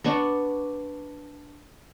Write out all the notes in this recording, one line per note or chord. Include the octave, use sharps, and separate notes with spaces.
B3 D4 C#6